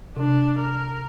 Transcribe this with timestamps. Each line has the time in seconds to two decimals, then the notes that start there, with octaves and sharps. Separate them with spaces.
0.17 C3 D4
0.59 A#4